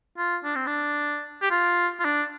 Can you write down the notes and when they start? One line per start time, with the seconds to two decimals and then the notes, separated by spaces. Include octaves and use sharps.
0.17 F4
0.44 D4
0.55 C4
0.67 D4
1.42 G4
1.50 F4
1.99 F4
2.05 D4